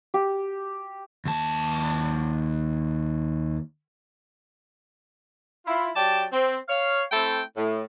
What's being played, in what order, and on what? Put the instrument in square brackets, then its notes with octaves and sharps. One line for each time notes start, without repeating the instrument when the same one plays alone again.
[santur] G4
[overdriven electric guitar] D#2 A5
[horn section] E4 F4
F#3 G4 D5 G5 A5
C4
C#5 F5
A3 C4 E4 A4 G5
A2